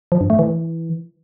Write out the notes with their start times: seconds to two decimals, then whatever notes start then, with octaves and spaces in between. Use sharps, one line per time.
0.12 F3
0.21 G2
0.30 A3
0.39 E3